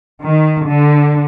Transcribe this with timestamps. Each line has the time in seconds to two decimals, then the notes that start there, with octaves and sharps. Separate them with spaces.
0.23 D#3
0.66 D3